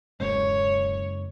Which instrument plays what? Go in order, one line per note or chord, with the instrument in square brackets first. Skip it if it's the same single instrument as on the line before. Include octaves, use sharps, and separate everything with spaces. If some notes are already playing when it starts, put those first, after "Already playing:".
[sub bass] D1 [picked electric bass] F#2 C#3 G#3 [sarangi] C#5